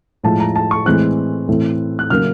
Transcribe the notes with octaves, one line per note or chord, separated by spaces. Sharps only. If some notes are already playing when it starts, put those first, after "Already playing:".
A2 F3 G#3 A5
A#5
A5
C#6
A2 E3 G#3 C4 F#6
A2 E3 A3 C4
F#6
C#3 F#3 A#3 C#4 F6